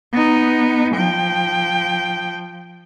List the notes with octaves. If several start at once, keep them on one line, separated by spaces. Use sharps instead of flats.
B3 D#4
F3 G5